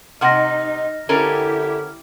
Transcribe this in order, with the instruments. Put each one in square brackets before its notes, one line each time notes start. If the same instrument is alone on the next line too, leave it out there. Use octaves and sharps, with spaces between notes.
[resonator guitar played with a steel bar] C3 F#5 [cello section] D#4 [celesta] F6 A#6
[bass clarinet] D3 [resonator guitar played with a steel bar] C#4 A4 A#4 [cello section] E4 G4